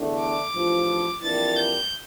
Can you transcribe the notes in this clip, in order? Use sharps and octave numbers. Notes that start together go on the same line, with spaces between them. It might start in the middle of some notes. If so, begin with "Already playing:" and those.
Already playing: E2 D3 A3 D4
D6
A1 G2 F3
F2 E3 G3 A#3 D4 A6
G6